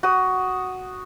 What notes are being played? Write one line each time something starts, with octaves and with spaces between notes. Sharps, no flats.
F#4 D#6